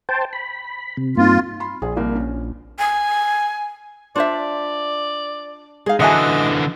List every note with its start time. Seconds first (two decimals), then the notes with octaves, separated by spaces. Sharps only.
0.09 C5 G5 A5
0.33 B5
0.97 C3
1.17 G2 A#3 C4 D#4 F4
1.60 B5 C6
1.82 A#1 G#4
1.97 C2 A#3
2.15 C#4
2.79 G#5
4.16 D4 F4 C5 D5 E5
5.86 G#3 D#4 G#4 F5
6.00 D3 E3 D4 F#4 D#5 E5 F#5 G#5